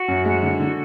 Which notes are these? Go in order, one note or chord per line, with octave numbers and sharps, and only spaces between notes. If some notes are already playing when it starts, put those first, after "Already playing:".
Already playing: F#4
F#2
G#3
D3
D3